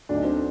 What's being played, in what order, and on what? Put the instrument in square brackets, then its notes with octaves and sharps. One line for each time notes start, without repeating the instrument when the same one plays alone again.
[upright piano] D2 D3 F#3 D4
D#4
C4 D4